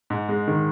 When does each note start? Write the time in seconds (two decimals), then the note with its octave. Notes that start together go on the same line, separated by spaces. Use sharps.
0.10 G#2
0.29 G#3
0.48 D#3